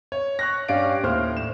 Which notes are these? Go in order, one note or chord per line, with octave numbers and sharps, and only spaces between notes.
C#5
C#6 F#6 A#6
G2 C#4 G4 D5 F5 D7
D#2 A2 C5 F6
E7